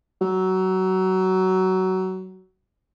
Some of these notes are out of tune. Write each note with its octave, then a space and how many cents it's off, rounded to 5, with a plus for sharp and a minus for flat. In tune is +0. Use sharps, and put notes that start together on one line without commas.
F#3 +20